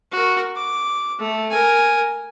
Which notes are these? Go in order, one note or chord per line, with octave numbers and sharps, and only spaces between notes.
F#4 A#4
D6
A3
A#4 G#5